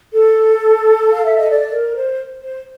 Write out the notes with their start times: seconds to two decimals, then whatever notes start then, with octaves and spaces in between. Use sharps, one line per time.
0.11 A4
1.13 F5
1.25 E5
1.37 D#5
1.49 D5
1.72 A#4
1.95 C5
2.41 C5